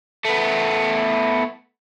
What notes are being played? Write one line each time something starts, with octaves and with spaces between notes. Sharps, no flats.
A3 B3